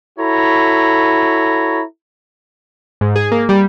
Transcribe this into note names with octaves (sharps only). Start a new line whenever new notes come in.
E4 F#4 A4 C#5 A#5 B5
G#2
G#4
A#3
G3